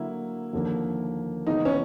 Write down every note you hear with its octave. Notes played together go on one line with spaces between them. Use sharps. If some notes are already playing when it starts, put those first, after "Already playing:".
Already playing: D3 F#3 A#3 E4
D#2 D3 F3 A#3
C#3 E3 G#3 B3 D#4
C#4